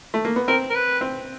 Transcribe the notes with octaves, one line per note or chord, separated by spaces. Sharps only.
A3
A#3
B3
C4 A#4
A#4
B4
C4